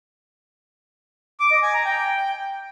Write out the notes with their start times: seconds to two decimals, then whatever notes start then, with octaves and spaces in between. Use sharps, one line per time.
1.40 D6
1.51 D#5
1.62 G#5
1.74 A#5
1.85 G5